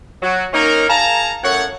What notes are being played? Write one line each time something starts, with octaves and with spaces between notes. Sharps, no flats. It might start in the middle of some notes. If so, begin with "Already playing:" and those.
F#3 F#4
A#3 C#4 D#4 A#4
G#4 F5 A5 A#5
F#2 A2 C#5 F#5